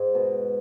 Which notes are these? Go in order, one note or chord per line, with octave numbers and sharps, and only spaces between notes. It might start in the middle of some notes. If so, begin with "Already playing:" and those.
Already playing: G#2 G#3
B2